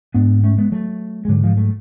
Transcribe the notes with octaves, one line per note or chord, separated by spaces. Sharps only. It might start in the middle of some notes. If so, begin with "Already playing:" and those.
G#2 B3 D4
A3 C#4
G#3 B3
F#3 A3
G#3
G#2 D3 F#3
F3 G#3
F#3 A3